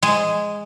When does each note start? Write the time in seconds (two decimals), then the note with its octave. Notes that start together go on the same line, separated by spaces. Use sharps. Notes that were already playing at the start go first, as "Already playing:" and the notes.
0.03 G#3